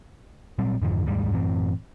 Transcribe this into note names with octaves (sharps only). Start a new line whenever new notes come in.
A#2 F#3 G3 C4
F2 G#2 D3 F3
D#2 G#2 G3 G#3
F#2 A2 E3 C4